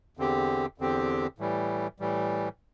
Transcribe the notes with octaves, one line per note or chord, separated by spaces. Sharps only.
E2 D3 C4 G4
E2 D3 C4 G4
A2 E3 G3
A2 E3 G3